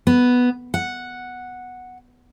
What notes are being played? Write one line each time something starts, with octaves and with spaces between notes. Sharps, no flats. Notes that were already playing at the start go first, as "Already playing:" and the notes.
B3
F#5